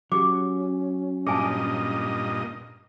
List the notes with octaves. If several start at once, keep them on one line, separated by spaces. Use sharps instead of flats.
F#3 C#4 G4 G#4 D6
G2 A#2 G#4 D#5 G#5 A5